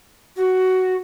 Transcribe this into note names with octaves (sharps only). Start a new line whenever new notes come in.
F#4